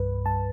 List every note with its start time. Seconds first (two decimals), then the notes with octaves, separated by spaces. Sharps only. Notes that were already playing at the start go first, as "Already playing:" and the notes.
Already playing: C2 G2 B4
0.26 G2 A5